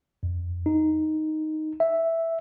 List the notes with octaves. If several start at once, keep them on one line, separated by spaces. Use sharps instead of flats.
F2
D#4
E5